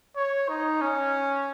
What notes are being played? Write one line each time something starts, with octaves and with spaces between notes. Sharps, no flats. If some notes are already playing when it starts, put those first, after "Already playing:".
C#5
D#4
C#4